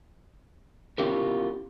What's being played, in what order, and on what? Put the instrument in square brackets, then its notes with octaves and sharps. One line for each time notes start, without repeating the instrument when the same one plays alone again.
[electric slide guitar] B3 C#4 E4 F4 G4 A#4